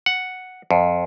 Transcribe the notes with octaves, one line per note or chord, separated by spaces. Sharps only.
F#5
F2